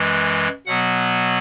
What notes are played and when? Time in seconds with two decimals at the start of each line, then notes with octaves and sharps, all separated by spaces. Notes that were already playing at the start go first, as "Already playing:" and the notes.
Already playing: F#2 E3 G#3
0.66 B2 F#3 B3 F#5